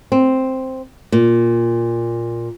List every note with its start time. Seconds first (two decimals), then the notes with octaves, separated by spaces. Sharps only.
0.12 C4
1.12 A#2